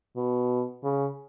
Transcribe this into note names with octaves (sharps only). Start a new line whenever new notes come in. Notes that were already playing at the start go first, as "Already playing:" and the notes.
B2
C#3